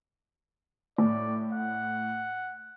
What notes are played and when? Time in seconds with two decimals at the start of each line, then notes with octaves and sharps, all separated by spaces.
0.98 A2 D5
1.53 F#5